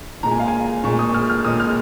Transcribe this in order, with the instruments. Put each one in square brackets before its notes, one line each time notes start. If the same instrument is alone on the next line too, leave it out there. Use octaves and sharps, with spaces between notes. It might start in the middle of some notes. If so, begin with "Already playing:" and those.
[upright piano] A#2 G#3 A#5
G#5
F5
G#5
A#2 G#3 C#6
D#6
F6
F6
A#2 G#3 D#6
F6